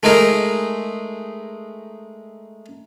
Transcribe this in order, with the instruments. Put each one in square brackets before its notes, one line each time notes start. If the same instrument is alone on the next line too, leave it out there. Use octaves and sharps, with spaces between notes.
[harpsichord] G#3 A3 D#4 G#4 A#4